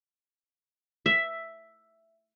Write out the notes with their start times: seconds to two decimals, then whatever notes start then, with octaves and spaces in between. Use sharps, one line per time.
1.06 E5